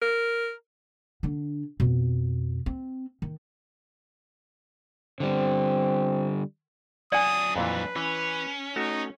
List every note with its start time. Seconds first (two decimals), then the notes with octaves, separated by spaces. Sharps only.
0.02 A#4
1.23 D3 D4
1.80 F2 B2
2.66 C4
3.22 D#3
5.20 D3 G3 C4
7.12 F#3 D4 D5 F#5 G#5 D#6
7.56 F2 A#2 E3 B4
7.96 E3 C#4
8.76 A3 D#4 F#4